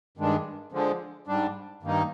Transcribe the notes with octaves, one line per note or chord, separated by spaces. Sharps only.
G2 D#3 G#3 D4
D3 F3 G#3
G#2 G3 D4
G2 D#3 A#3 D#4